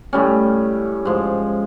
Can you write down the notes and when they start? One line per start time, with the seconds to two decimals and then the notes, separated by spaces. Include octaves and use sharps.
0.13 A2 G3 C#4
1.05 G#2 F3